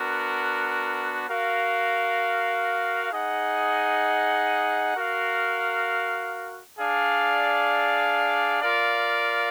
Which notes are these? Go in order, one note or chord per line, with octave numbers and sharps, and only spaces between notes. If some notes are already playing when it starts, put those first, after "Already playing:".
Already playing: B3 D4 F#4 A#4
F#4 A#4 F5
D#4 G#4 D#5 F#5
F#4 A#4 F5
D4 G#4 D5 F5
F4 A#4 D5 F5